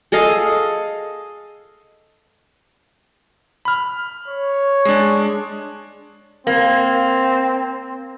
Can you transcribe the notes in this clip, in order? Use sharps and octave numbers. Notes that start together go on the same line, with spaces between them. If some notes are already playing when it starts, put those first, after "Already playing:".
G#4 A4 D#5 F5
B5 F6
C#5
G#3 D4
A#3 C4